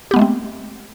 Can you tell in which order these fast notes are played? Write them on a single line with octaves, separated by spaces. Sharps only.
G4 B3 G#3 A3 C4